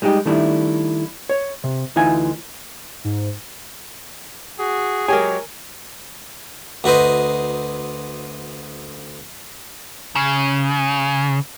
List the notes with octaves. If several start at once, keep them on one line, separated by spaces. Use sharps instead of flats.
G3 G#3 D#4 F#4 G4
D#3 G3 A3 D4 E4
C#5
C3
D2 E3 D#4 F4 G#5
G#2
F#4 G#4
F#3 G#3 G4 A#4 C#5 G5 G#5
D2 F#4 B4 C5 D#5
C#3